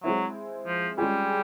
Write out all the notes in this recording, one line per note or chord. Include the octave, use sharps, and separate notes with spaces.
F#3 G#3 C4 E4
F3
G3 G#3 C#4 F4 G#4